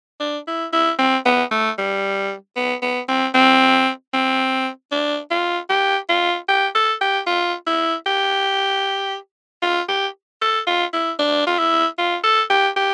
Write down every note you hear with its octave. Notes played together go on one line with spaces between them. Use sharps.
D4
E4
E4
C4
B3
A3
G3
B3
B3
C4
C4
C4
D4
F4
G4
F4
G4
A4
G4
F4
E4
G4
F4
G4
A4
F4
E4
D4
F4
E4
F4
A4
G4
G4